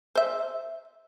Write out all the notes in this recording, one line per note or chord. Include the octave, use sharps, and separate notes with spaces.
C5 E5